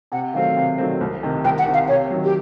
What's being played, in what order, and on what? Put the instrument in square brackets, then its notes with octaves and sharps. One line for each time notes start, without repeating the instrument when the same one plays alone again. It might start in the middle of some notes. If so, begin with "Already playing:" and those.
[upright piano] C3 [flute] F#5
[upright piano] D#3 F#3 A3 C4 [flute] F5
[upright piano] C3
D#3 F#3 A3 C4
C2
C3 D#3
[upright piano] C2 [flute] G5
[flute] F#5
[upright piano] C3 D#3
[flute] F5
[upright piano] C3 [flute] C#5
[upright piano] D#3 F#3
[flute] G4